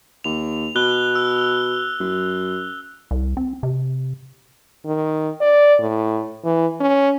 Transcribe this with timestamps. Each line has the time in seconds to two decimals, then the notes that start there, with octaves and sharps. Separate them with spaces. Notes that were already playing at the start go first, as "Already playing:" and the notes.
0.24 D#2 F7
0.76 B2 F#6 G7
1.15 E6
2.00 F#2
3.11 C2
3.37 C4
3.63 C3
4.86 D#3
5.41 D5
5.80 A2
6.45 E3
6.81 C#4